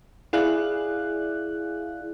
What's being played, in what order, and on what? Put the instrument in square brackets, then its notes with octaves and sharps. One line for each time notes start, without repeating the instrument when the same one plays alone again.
[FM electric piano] E4 G#4 D5 F5 F#6